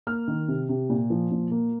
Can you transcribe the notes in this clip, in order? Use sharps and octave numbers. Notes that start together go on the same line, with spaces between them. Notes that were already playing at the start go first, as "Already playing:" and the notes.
A#3 F6
D#3
C3
C3
A#2
F3
A#2
A#3